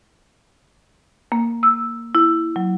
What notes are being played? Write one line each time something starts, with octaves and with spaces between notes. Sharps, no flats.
A#3
E6
E4
F#3